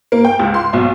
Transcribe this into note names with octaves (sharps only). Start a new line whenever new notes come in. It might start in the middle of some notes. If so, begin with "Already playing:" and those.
A#3
G5
C#2
C6
B1